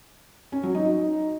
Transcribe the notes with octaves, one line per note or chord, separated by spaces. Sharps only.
C#4
F#3
D#4